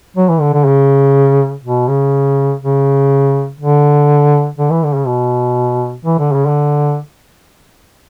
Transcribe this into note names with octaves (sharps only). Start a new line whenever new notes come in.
F#3
E3
D3
D3
C#3
B2
C#3
C#3
D3
D3
E3
D3
C#3
B2
E3
D3
C#3
D3